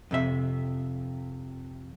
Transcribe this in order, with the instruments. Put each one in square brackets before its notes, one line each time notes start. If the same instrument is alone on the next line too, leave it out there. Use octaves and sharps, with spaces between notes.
[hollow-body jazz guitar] F2 C3 E5